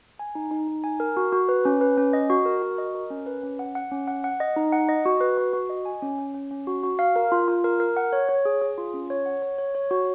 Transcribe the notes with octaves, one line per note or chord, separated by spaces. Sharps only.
G#5
D#4
D#4
D#4
G#5
A#4
F#4
F#4
B4
C#4
B4
C#4
D#5
F#4
A#4
F#4
D#5
A#4
C#4
B4
C#4
F#5
F#5
C#4
F#5
F#5
D#5
D#4
F#5
D#5
F#4
B4
F#4
F#4
D#5
G#5
C#4
C#4
C#4
C#4
F#4
F#4
F5
A#4
F4
F4
A#4
A#4
F#5
C#5
C#5
G#4
G#4
F4
C#4
C#5
F#5
C#5
C#5
C#5
F#4